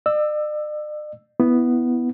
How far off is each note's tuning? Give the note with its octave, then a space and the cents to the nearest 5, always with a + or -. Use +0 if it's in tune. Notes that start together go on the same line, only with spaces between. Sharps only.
D5 +45 E6 +0
B3 +0 E4 +0